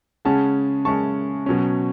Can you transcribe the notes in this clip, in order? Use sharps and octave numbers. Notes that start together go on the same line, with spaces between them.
C#3 G#3 C#4 F#5 A5
C#3 G#3 C#4 A5 C#6
B2 F#3 C#4